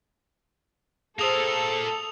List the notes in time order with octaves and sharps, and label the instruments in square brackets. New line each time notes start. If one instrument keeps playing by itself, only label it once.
[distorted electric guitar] A#3 F4 [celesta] G#4 C5 [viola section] A4 [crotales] D#6 F7